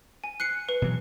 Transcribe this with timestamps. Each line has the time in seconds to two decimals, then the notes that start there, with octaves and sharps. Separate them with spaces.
0.24 G#5
0.40 F#6 C7 C#7
0.69 B4
0.82 B2 E3 F#3